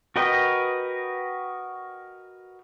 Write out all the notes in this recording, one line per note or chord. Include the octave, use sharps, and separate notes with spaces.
F#4 A#4 B4 D#5 G5